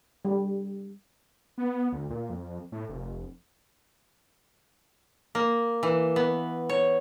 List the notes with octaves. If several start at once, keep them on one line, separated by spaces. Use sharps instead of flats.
G3
B3
D2
A#2
F2
A2
F1
A#3
E3
B3
C#5